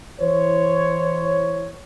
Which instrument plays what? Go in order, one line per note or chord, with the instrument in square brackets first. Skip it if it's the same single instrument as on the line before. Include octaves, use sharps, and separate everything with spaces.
[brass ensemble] E3 E4 C5 C#5